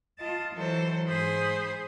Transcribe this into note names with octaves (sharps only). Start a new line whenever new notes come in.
F4 D#5 A5
E3 F#3 A4 C5
G#2 G#4 C5 B5 C6